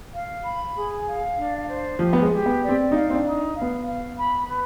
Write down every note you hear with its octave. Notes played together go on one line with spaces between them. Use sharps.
F5
B5
G#4
F5
D4
C5
F3 G4
B3
G#3
G4
B3
D5
C4
D#4 F5
C4
D4
D#4
F5
B3
F5
B5
B4